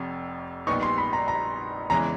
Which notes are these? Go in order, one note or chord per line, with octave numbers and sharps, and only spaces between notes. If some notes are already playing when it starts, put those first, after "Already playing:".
Already playing: F1 F2 C3
A#1 A#2 G3 B3 D#4 C#6
C6
B5
A#5
A#5
E2 C#3 E3 G#3 A#5